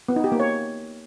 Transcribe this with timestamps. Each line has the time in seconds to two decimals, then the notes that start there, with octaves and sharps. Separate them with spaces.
0.09 B3
0.16 D#4
0.24 G4
0.32 A#3
0.40 C#5